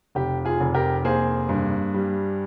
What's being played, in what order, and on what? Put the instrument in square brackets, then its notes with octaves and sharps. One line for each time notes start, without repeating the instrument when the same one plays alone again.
[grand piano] F1 G4
F4 G#4
F1
G4 A#4
A#3 G#4 C5
G2
G3